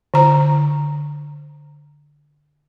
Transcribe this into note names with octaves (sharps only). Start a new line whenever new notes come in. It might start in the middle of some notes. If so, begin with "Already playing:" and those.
D3 A#5